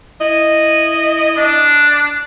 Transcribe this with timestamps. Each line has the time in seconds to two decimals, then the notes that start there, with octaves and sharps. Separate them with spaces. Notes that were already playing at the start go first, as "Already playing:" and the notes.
0.21 E4 D#5
1.38 D4